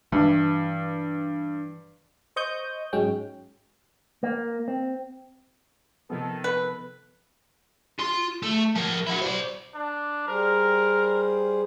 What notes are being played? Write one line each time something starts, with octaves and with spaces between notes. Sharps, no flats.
G2 E3
C5 D#5 C#6 D#6 G6
G#2 F#3 G#3 C#4 G5
A#3
C4
C3 D#3 F3 B3 A4
B4
F4 C6
A3
F3 A#4
E4 F#4
C5 D5
D4
G3 G#4 A#4 C5